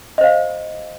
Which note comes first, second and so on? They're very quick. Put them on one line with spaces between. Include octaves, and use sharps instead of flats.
D#5 C5 F5